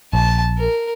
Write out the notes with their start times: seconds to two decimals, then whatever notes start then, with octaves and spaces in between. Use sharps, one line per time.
0.13 A#1 A5
0.58 A#4